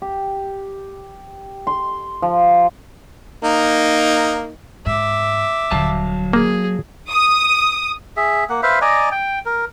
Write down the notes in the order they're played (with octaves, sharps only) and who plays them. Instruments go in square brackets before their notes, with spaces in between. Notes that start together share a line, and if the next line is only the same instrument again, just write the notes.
[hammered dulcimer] G4
C6
F3
[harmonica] A#3 D#4
[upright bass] G#2 [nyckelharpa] E5 D6
[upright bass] D#1 D3 [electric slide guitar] F#3 F5 A5
[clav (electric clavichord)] A#3 [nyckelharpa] G#4
[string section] D#6
[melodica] G#4 E5
A#3 F#5
B4 C5 E5 F5
D5 D#5 G#5 A#5
G5
A#4